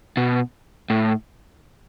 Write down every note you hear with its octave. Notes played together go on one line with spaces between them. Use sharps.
B2
A2